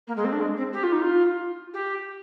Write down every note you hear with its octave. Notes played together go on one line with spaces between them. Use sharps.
A#3
G#3
C4
D4
G#3
C4
G4
F4
D#4
F4
G4